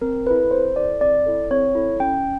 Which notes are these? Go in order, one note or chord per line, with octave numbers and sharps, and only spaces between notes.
C4 A#4
E4 A4 B4
C4 C5
E4 A4 D5
C4 D5
E4 A4
C4 C#5
E4 A4
C#4 G5